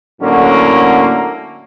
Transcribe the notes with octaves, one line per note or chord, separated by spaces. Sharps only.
A2 D3 F#3 A#3 C#4